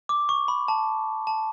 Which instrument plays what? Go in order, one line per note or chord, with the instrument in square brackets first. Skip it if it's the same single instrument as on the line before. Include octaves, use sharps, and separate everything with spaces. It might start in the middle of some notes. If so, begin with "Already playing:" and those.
[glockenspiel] D6
C#6
B5
A5
A5